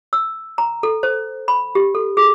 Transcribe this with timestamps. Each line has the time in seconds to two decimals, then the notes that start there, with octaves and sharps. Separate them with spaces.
0.13 E6
0.58 A#5
0.83 A4
1.03 C5
1.48 B5
1.75 G4
1.95 A4
2.17 G#4